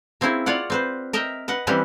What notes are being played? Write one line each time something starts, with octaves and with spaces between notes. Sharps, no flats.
A#3 C4 C#4 E4 G#4
F4 C#5 D5 F#5
C4 B4 C5
A#4 D#5 E5 G5
B4 D#5 F#5
E3 G3 C4 C#4 B4